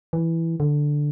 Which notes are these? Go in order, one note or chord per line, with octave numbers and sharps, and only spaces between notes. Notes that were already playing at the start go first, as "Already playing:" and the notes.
E3
D3